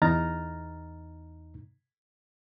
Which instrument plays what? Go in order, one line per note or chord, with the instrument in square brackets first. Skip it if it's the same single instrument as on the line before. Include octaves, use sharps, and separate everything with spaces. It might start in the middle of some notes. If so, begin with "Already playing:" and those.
[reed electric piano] E2 D#4 A#5 F6 A6